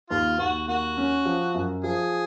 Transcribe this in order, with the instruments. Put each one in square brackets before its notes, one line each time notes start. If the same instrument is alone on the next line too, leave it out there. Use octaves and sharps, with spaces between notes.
[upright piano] D#2 [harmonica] F4
[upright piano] D#2 [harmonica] F#4
[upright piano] A#3 [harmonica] F#4
[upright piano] C#4
F3
F#2
[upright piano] F3 [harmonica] G#4